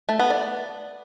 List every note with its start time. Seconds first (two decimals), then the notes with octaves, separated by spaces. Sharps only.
0.09 A3
0.19 B3
0.30 D5